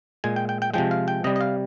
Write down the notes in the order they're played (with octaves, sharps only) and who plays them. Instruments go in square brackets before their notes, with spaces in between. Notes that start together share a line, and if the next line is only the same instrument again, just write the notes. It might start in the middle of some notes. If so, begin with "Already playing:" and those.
[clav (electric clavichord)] A#2 G#3 G#5
G5
G5
G5
C3 F3 G#3 G5
F5
G5
C3 D#5
G3
D#5
F5